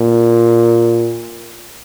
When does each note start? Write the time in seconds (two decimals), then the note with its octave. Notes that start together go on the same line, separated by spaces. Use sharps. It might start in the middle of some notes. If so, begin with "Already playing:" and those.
Already playing: A#2